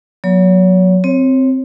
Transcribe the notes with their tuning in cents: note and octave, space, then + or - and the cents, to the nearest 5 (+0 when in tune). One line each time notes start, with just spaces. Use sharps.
F#3 -20 B3 -45 C#5 +35
C4 +0 C#5 -20